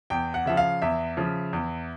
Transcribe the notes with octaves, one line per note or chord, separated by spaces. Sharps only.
E2 G5
F#5
C#3 F3 E5
F5
E2 E5
C#3 F3
E2